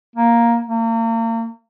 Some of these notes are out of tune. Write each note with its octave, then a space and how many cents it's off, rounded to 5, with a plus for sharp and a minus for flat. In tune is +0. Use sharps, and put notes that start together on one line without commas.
A#3 +5
A#3 -40